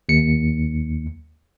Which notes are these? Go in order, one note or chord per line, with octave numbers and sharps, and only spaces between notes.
D#2 C#7